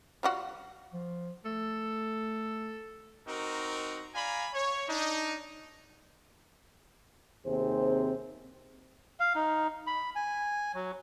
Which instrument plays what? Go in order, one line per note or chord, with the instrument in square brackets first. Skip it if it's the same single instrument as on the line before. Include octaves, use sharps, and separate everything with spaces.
[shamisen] G3 F4 F#4
[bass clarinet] F3
[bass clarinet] A3 [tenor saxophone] A4
[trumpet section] C4 D#4 F#4 A#4
D5 F5 G#5 A#5 B5
C#5
D4 D#4
[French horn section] D#2 C3 C4 G#4 C5
[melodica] F5
D#4
B5
G#5
F#3